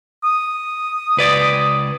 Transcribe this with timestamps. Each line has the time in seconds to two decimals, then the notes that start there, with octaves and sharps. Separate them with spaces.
0.24 D#6
1.17 C#2 B4 D5